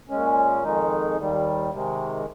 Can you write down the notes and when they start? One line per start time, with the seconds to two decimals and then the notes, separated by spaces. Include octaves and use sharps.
0.09 A#2 G#3 C#4
0.63 F2 D#3 G#3 D#4
1.17 D#2 D#3 G3
1.72 C3 D#3 G#3